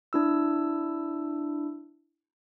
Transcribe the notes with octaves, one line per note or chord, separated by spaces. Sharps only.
D4 E4 E6